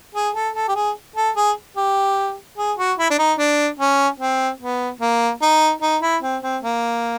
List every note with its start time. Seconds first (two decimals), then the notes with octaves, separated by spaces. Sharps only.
0.15 G#4
0.35 A4
0.55 A4
0.68 G4
0.76 G#4
1.16 A4
1.36 G#4
1.77 G4
2.58 G#4
2.78 F#4
2.99 E4
3.10 D4
3.19 D#4
3.39 D4
3.80 C#4
4.20 C4
4.61 B3
5.01 A#3
5.42 D#4
5.82 D#4
6.02 E4
6.23 C4
6.43 C4
6.63 A#3